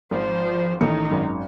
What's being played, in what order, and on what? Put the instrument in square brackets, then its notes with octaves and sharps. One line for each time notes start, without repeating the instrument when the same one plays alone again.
[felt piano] G#1 [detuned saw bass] F3 [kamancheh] C5
[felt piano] A1 A3 C#7 [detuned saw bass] D#3 [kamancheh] D#4
[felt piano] G#1 F#2